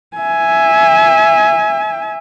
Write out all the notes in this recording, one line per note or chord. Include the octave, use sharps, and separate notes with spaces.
E5 G#5